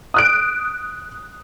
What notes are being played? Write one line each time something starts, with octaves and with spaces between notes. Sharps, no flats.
D#6 F#6 D7